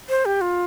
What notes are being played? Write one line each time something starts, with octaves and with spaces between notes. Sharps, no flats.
C5
G4
F4